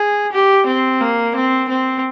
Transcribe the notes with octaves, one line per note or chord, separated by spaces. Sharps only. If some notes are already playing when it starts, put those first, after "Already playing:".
Already playing: G#4
G4
C4
A#3
C4
C4